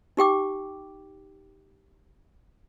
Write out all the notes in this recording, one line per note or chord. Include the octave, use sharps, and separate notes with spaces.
D#4 G4 G5 D6